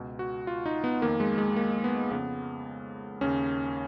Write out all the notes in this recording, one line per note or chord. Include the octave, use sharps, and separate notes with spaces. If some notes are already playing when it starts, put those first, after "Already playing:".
Already playing: C#2 B2
F#4
F4
D#4
B3
F2 D#3 A#3
G#3
G#3
A#3
B3
F2 C#3 B3
D#2 C#3 C#4